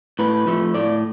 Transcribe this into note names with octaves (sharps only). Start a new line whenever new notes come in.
A2 B4
F3 A3
A2 D5